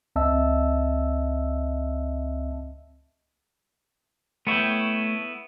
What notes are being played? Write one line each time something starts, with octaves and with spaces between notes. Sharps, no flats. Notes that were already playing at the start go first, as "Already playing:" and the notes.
C#2 C4 D#5 E5 A5 E6
A3 B3 E4 C#5 G5